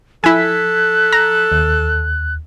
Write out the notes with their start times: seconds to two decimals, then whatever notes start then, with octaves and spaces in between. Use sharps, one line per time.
0.24 F3 E4 A4 G#5 F#6 G#6 B6
1.13 A#5
1.52 D#2